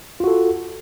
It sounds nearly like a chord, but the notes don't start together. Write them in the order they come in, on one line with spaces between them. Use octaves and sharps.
F4 F#4 A4